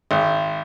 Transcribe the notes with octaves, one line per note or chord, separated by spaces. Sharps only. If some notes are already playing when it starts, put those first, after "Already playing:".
G#1